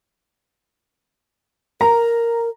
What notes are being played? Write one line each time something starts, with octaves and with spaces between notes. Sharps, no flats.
A#4 A#5